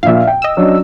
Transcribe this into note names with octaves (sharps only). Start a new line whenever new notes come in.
A#1 A#2 E5 F5
G5
D#5 E6
F#3 C#4 D4